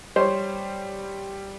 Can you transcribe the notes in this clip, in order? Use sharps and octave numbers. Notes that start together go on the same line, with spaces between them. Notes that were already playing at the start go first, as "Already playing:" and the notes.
G3 C5 C#5